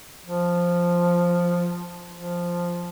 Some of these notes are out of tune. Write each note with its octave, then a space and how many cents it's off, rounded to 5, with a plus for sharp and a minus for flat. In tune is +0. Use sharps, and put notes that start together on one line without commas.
F3 +0
F3 +0